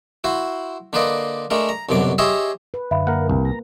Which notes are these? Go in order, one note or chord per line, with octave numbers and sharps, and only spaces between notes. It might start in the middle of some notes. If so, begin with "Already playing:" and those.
E4 F#4 C5
D3 A#3 B4 C5 D5 D#5
G#3 A3 D4 A#4
A#5
C2 F#2 B2 D3 D6
G4 G#4 C5 C#5 D#5 E5
B4
F#2 D3 E5 F5 B5
A#3 A#4 F#5
C2
A#5